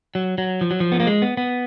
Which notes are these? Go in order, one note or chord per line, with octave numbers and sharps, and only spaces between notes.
F#3
F#3
F3
F#3
F3
B3
A#3
G#3
B3
B3